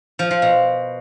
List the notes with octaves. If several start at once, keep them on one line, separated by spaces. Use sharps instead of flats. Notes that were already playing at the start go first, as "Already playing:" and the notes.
F3
F3
B2